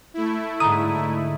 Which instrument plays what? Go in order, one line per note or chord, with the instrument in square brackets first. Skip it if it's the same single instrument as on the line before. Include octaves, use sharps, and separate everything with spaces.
[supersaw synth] A3 E4
[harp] G#2 D3 [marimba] A#5 [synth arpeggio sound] D#6